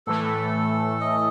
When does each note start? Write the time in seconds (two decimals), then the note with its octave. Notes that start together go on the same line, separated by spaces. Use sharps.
0.07 A2 E3 A3 A4
1.01 D#5